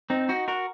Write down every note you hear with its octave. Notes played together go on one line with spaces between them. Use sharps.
C4 D#4
D#4 F#4
F#4 A#4